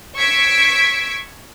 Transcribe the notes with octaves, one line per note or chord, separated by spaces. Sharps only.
C#6 E6 G#6 B6 C#7 D7